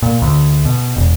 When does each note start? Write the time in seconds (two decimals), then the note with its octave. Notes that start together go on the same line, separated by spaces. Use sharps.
0.02 A#2
0.22 D2
0.65 B2
0.96 E1